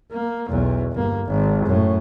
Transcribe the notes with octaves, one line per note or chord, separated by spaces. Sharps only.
A#3
B1 E2
G1 A#3
G#1
F#2 A2